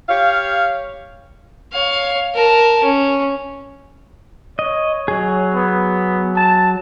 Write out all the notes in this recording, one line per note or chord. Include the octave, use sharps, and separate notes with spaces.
G4 C#5 F5
C#5 F5
A#4 A5
C#4
C#5 D#5
F#3 G#4
B3
A5